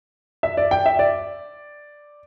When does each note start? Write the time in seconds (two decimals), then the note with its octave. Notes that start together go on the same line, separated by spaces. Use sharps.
0.43 E5
0.57 D5
0.71 G5
0.86 E5
0.99 D5